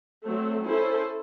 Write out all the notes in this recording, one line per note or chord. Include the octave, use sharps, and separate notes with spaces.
F#3 A3 C4
C#4 E4 A4 C5